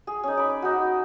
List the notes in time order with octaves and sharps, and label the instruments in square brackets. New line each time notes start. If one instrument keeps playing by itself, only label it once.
[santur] G#4
C#4 D#4
B5 D6
D#4 F#4